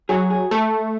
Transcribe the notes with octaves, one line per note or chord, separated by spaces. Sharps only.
F#3 G#4
G#4
A3 A4